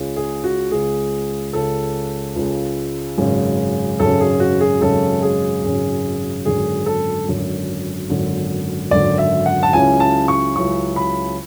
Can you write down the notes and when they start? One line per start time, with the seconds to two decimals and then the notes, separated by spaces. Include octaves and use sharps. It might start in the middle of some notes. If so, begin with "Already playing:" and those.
Already playing: C#2 C#3 G#3
0.16 G#4
0.44 F#4
0.71 C#2 C#3 G#3 G#4
1.53 C#2 C#3 G#3 A4
2.36 C#2 C#3 G#3
3.18 G#1 F#2 C#3 G#3 C#4
4.00 G#1 F#2 C#3 G#3 C#4 A4
4.21 G#4
4.40 F#4
4.61 G#4
4.81 G#1 F#2 C#3 G#3 C#4 A4
5.22 G#4
5.63 G#1 F#2 C#3 G#3 C#4
6.45 G#1 F#2 D3 G#4
6.86 A4
7.28 G#1 F#2 D3
8.10 G#1 F#2 D3
8.91 G#1 F#2 D3 D5
9.18 E5
9.46 F#5
9.63 A5
9.73 C#2 C#3 F#3 C#4 E4 G#5
10.00 A5
10.28 C#6
10.56 C#2 C#3 F#3 C#4 E4 C#6
10.96 B5